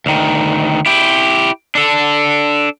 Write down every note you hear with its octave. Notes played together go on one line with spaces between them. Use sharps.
D2 D#3
E4 G4
D4 A4